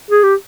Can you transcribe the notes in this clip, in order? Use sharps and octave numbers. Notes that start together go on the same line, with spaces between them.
G#4
G4